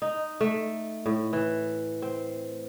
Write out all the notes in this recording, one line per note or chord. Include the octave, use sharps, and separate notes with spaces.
D#4
A3
A2
E3
C4